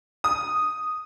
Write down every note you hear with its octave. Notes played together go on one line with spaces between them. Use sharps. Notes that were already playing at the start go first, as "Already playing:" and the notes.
D#6